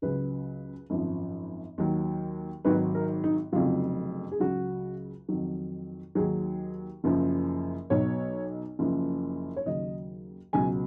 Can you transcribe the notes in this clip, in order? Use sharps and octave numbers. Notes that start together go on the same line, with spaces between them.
C#2 C#3 F#3 B4
G#1 F#2 F3
D#2 D#3 F#3
G#1 G#2 D#3 F#3 B4
A#4
D#4
F1 F2 C#3 F#3 F4
G#4
C#2 C#3 F#3 F#4
F2 D#3 F#3
D#2 D#3 F#3 G#4
F#1 F#2 F3
B1 B2 F#3 C#5
F#1 F#2 F3
C#5
D#2 C#3 F#3 D#5
C#2 B2 F#3 G#5